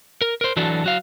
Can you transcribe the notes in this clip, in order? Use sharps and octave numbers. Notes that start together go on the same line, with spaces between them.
A#4
A#4 C5
E3 F#3 D4 F#4 A4
F#3 F#4 F5